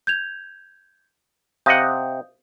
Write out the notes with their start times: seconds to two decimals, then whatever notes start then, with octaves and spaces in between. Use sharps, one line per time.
0.07 G6 G#6 F7
1.66 C3 D#5 F5 F#5 D#6 G6